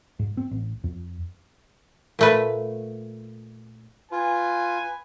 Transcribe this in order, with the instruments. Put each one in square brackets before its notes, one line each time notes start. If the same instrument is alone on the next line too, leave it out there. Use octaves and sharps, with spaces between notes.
[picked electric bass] G#2
C4
A1
F2
[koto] A#2 A3 B4
[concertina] F4 [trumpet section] B4 G#5